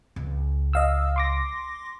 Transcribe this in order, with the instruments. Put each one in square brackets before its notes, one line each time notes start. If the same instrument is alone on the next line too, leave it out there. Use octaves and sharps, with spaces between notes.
[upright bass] C#2
[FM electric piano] D#5 F5 E6
C6 D6 A#6